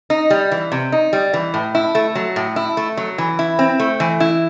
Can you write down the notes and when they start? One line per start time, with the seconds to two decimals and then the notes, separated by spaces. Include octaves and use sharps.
0.10 D#4
0.30 G3
0.52 E3
0.72 C3
0.92 D#4
1.13 G3
1.34 E3
1.54 A2
1.75 E4
1.95 A3
2.15 F#3
2.36 A2
2.56 E4
2.77 A3
2.97 F#3
3.18 E3
3.39 E4
3.59 C4
3.80 A3
4.00 E3
4.20 E4